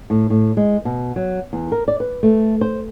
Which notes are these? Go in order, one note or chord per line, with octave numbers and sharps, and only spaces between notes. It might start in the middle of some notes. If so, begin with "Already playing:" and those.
A2
A2
G#3
B2
F#3
E2
A#4
D5
B4
A3
C5